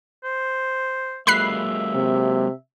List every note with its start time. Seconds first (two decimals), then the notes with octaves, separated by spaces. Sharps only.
0.24 C5
1.27 F#3 G#3 A#3 E5 B5 F#6 C7
1.95 C3